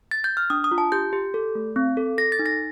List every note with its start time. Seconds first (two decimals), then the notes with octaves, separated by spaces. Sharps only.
0.11 A6
0.24 G6
0.37 F6
0.50 D4 D#6
0.64 D#6
0.71 F4
0.78 A5
0.92 G4 G6
1.13 G4
1.34 A4
1.55 A3
1.76 C4
1.97 A4
2.18 A4 A#6
2.32 A6
2.39 D#4
2.46 A#6